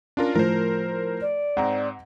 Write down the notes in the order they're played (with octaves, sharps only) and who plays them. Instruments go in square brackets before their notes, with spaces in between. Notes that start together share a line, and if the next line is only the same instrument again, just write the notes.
[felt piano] C#4 [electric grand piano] D4 F4 A#4
[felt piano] A2 F3 [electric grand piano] A#4 C5
[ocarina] D5
[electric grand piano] G#2 C4 [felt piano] F#5 A#5